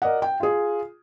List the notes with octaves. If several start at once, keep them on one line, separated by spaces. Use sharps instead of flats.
A#4 D5 D#5 F#5
G5
F4 G#4